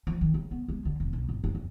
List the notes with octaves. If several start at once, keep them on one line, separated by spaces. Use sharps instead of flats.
F3
D#3
C#3
B3
G#3
D3
E1
B1
G1
F#1
D2